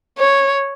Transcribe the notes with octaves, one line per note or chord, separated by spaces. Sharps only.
C#5